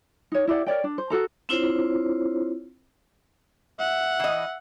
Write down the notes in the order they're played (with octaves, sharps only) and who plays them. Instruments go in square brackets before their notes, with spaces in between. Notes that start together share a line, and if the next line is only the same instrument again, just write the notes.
[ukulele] D#4 C#5
E4 G4 D5 F#5
A#4 C#5 D5 G5
D4
C5
F#4 A4 A#5
[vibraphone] C4 D4 E4 F4 C5 C#5
[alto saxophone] E5 [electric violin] F#5
[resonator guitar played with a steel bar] E3 D#5